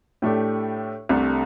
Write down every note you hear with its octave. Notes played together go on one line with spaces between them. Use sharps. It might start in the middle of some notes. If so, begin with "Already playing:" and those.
A2 A3 D4 G4
C2 C3 A3 D4 A4